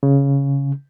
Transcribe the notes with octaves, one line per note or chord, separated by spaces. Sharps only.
C#3